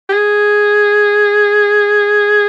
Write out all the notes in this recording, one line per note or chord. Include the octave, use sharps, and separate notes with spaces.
G4
G#4